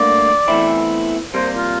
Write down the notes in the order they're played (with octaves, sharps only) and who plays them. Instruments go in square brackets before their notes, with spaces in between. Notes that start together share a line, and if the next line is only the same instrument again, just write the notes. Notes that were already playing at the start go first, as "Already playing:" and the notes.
Already playing: [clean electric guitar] D2 D3 G3 A#3 [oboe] D5
[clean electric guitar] E2 E3 A3 C4 E4
[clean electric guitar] C3 G3 A#3 [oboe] C5
[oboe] F4